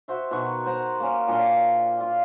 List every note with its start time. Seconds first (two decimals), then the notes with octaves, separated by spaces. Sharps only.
0.08 F#4 C5 E5
0.31 B2 D#3 F#4 C#6
0.66 C5 F#5 A#5
1.00 A#3 C#4
1.27 A#2 D4 F5 C6
2.01 F4